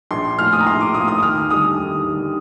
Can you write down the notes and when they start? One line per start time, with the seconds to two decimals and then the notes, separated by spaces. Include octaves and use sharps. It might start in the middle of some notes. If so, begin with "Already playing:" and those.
0.11 A#1 C6
0.39 A2 F3 A#3 F6
0.53 D#6
0.60 A#5
0.66 A#1 C6
0.81 D6
0.94 A2 F3 A#3 D#6
1.08 D#6
1.22 D#2 F6
1.50 D3 G3 D#6
1.78 D#2
2.06 D3 G3